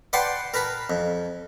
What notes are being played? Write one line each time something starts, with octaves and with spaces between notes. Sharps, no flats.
B4 D5 F#5 G5 A5 C6
A#4 B4 A5 B5
F2